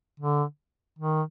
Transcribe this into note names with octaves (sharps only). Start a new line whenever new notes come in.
D3
D#3